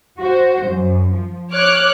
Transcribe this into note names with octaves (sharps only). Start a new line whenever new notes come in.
F#4 C5
F#2
F3
C#5 D6 F6 F#6